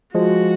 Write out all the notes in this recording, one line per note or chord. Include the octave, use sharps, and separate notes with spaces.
F3 G#3 F#4